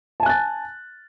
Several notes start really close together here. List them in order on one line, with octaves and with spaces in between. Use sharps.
A5 G#5 F#6 A6